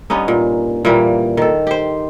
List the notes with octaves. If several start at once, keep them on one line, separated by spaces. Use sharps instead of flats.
G2 B3 C#4 D#4
A#2
A#2 E3 G3 A#3
D#3 A4
G4 C5